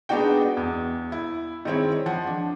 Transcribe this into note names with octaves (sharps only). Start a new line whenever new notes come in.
G#3 B3 D4 D#4 F#4 G5
E2
E4
D#3 G#3 C4 E4 C#5
F3 F#5
D4